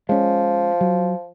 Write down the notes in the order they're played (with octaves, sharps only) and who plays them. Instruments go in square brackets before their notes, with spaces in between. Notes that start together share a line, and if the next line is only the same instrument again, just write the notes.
[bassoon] F3 [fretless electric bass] G#3 C#4
[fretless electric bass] F#3